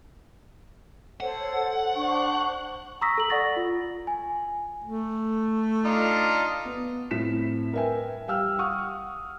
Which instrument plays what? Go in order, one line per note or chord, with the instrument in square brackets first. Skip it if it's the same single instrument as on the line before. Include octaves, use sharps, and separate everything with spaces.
[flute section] A4 C5 C#5 [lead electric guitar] F#5
[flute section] D4 C5 C#6
[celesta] A#5 C#6 D#6 E6 A#6 B6
A4 A#5 F#7
D5 F#5 C#6 A6 A#6
F4
G#5
[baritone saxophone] A3
[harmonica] D4 D#4 F4
[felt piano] B3
A2 C4 E4 B6 E7
A#4 B4 E5 G5 G#5
G3 F5 G5 E6 F6
F5 F#5 C#6 D#6 F6